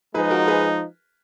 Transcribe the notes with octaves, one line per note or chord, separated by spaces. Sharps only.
F3 G#3 D#4 G#4 B4
F#4 A#4
G#4 B4